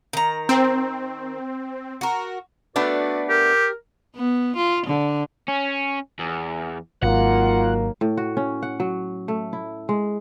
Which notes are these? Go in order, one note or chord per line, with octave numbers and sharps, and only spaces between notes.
D#3 A#5
C4
F#4 A#4
A3 B3 D4 F#4 B4 D5
G4 A#4
B3
F4
D3
C#4
E2
G#1 D#3 F#3 A#3 F4 F#5
A2
F#4
C#4
F#5
F#3
A3
E4
G#3